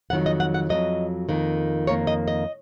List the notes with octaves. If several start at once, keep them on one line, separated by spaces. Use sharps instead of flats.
F2 D#3 F#3 F#5
D#5
F#5
F#5
F2 D#3 F#3 D#5
F2 D#3 A#3
F2 D#3 A#3 C#5
D#5
D#5